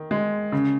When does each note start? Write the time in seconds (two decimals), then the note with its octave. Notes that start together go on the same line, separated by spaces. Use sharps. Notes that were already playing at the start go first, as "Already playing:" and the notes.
Already playing: D#3
0.11 G#3
0.52 C#3